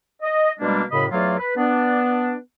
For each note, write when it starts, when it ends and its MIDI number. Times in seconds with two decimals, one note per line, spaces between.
0.23 0.52 75
0.60 0.84 47
0.60 0.84 55
0.60 0.84 56
0.60 0.84 58
0.60 0.84 62
0.92 1.06 42
0.92 1.06 45
0.92 1.06 49
0.92 1.06 75
0.92 1.06 83
1.12 1.39 40
1.12 1.39 54
1.12 1.39 57
1.12 1.39 65
1.12 1.39 74
1.12 1.39 77
1.39 1.54 71
1.57 2.36 59
1.57 2.36 62